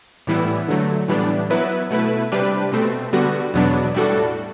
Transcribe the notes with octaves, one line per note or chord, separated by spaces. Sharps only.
A2 E3 G3 B3 E4
D3 F#3 A3
A2 E3 G3 B3 D4
F#3 B3 E4 B4
B2 A3 E4 B4
C3 G3 D4 G4 B4
B2 A3 C4
D3 G3 B3 F#4
E2 B2 F#3 B3 D4
A2 G3 D4 F#4 A4